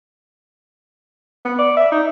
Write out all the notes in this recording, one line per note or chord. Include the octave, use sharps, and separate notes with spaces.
B3
D5
E5
D#4